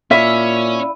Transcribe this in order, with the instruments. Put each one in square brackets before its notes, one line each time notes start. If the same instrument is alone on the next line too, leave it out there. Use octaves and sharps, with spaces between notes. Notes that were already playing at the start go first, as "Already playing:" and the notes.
[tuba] A#2 [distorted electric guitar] C#4 C#5 [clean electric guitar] E4 D5 F5 [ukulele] E5